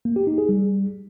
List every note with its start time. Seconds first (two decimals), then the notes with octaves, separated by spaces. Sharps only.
0.05 A#3
0.16 G4
0.27 D#4
0.38 G#4
0.49 G3